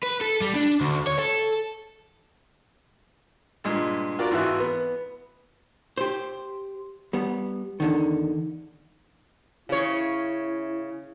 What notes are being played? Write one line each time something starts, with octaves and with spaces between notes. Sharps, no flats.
B4
A4
G3
D4
D2
C#5
A4
G2 A#2 G#3
F4 F#4 A#4 D5
G#1 E3 F#4 E5
B3
G4 C5
G3 B3
E2 D3 D#3
C#3 E4 C#5